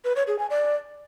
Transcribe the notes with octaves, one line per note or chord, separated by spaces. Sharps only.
B4
C#5
G#4
G#5
D5